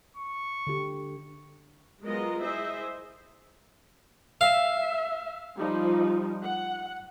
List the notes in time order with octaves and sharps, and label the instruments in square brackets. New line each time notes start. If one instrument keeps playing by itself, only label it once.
[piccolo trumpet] C#6
[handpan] D3 G4
[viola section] F#3 G#3 B3 F4 A#4 D#5
E4 G#4 C5 D#5 E5
[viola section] E5 [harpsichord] F5
[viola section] F3 G3 D#4
F#5